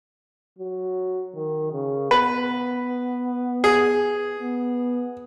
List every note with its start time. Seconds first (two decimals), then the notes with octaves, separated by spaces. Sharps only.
0.59 F#3
1.35 D#3
1.73 C#3
2.11 B3 B4
3.64 G#4
4.40 B3